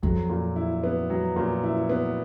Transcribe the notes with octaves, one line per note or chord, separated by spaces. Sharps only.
F2 F#3
A#2
E4
B3
F#3
A#2
E4
B3